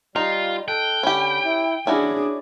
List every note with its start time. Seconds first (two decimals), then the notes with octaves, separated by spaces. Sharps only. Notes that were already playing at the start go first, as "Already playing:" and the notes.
0.16 G3 D#4 F4
0.68 A4 G5 F#6
1.03 D3 C#4 G4 B5
1.45 E4
1.87 C#4 D4 E4 F#4 G#4 D5